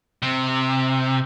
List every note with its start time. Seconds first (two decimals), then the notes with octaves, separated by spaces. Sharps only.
0.22 C3